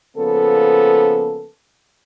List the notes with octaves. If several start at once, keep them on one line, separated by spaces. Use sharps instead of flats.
C#3 F3 A#3 B3 A4